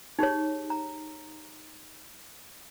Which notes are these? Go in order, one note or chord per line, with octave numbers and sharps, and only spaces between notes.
D#4 G4 G#4 C#5
A#5